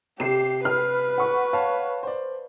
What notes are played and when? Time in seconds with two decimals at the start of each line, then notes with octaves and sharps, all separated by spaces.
0.20 C3 G4 C7 E7
0.65 B4 F6
1.18 F#5 C#6
1.53 C#5 F5 A5
2.03 C5 D5